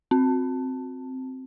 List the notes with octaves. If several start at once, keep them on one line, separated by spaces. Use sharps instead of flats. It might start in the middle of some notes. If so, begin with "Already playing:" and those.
C4